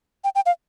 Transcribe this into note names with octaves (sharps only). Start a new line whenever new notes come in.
G5
G5
F5